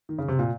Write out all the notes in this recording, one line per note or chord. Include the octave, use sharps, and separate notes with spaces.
D#3
C#3
C3
A#2